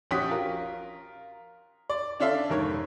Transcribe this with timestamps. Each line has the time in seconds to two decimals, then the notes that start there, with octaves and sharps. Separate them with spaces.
0.11 A#1 C#4 F#4 G4 D#6 B6
0.30 F4 A#4
1.90 D5
2.20 C#4 D4 A4 E5 F5
2.50 F1 G#2 A#4 C#5